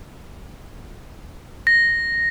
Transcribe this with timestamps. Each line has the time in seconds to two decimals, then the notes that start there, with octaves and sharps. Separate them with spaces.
1.67 A#6